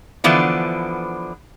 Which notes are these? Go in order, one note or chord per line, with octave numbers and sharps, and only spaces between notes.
D3 E3 F3 B3 D4